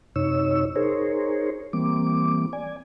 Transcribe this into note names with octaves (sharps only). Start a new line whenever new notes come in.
F#2 C3 D#4 C#5 E6
D#4 G#4 A#4 C5 C#5
E3 G3 A#3 C4 D6
D5 G#5